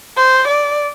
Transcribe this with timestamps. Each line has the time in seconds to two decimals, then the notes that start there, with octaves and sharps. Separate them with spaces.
0.17 C5
0.47 D5